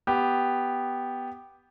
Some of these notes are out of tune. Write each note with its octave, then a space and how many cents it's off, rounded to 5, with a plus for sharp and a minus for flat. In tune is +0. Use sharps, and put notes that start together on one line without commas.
B3 +0 G4 +0